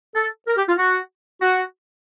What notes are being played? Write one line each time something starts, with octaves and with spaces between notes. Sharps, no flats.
A4
A#4
G4
F4
F#4
F#4